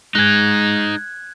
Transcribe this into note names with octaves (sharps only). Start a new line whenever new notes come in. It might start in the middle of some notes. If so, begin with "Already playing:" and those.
G#3 D#4 G#4 F#6 G#6